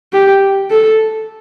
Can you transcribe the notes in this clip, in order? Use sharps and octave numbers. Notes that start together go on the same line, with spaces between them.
G4
A4